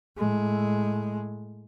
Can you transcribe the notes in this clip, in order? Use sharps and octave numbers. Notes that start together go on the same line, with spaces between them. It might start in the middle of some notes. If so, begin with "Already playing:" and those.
A2 G#3